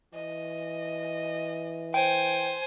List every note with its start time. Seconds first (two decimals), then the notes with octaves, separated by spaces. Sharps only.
0.14 E3 D#5
1.94 C5 G5 G#5